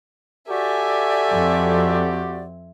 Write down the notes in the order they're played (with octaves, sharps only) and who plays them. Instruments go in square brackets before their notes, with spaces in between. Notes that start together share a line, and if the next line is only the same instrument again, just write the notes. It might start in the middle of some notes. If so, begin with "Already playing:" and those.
[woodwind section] F#4 G4 D5 [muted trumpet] A4 [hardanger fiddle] E5 G#5
[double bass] F2 C4